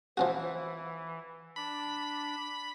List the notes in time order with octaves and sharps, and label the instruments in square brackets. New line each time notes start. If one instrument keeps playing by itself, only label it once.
[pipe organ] E3 [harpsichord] F3 C#4 F#4
[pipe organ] D4 [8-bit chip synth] B5